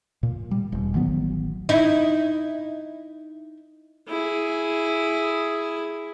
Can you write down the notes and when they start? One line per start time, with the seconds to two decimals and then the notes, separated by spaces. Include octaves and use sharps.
0.23 A#2
0.51 G3
0.72 E1
0.94 A1 D#3 F#3 B3
1.69 D#4 E4
4.08 E4 G#4